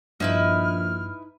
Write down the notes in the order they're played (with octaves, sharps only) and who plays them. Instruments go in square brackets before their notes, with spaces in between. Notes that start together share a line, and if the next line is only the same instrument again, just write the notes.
[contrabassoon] A#1 [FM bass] G2 [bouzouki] D#4 E4 B4 [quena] F6